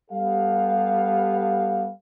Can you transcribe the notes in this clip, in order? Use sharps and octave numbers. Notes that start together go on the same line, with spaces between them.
G3 B3 G4 A4 F5